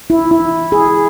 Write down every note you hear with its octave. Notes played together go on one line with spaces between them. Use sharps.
E4
E4
G#4